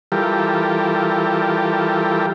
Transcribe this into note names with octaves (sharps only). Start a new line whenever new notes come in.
E3 G3 F4 G4 A4 A#4